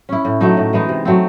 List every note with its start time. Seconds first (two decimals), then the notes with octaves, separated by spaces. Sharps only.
0.09 C#4 E4
0.25 A2
0.41 F#3 A3 D#4
0.57 A2
0.73 E3 G#3 D#4
0.89 C3
1.05 F#3 A3 C4